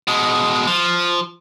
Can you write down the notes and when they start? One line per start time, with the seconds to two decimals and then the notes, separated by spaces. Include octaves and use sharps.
0.08 B2 G#3
0.67 F3